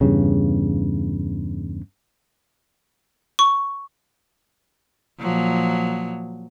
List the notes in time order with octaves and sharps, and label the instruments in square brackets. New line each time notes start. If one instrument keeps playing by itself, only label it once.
[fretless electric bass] E2 G2 C#3
[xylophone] C#6
[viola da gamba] A#2 F3 F#3